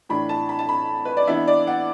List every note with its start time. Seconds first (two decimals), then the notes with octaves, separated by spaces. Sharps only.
0.09 A2 E3 D4 B5
0.29 A5
0.49 B5
0.59 A5
0.69 B5
1.05 B4
1.17 D5
1.27 E3 B3 D4 E5
1.48 D5
1.67 F#5